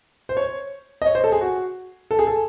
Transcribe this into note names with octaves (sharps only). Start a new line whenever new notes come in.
C5
C#5
D#5
C#5
C5
A4
G#4
F#4
A4
G#4
A4